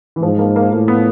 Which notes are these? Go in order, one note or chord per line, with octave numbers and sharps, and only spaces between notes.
E3
G#2 F3
A#3
A#3
A2 A#3
B3